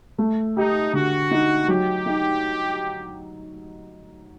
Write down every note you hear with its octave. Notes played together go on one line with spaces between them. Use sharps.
A3
D#4 G4
D3 F#4
D#4
F#3 G4
D#4